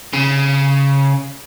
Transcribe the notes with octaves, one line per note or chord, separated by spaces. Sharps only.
C#3